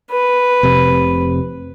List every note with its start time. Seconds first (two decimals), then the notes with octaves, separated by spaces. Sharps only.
0.11 B4
0.63 F1 C3